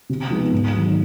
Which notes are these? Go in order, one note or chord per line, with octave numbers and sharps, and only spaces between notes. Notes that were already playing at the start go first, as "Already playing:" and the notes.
C3
F3 G#3 B3 D#4
G#2
D#3 F#3